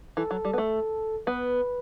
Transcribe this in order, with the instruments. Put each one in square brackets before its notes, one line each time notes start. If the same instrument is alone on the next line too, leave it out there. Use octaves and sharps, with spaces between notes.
[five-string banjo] E3 [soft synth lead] A4
[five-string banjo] F#3
G3
B3
A3
[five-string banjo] B3 [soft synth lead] B4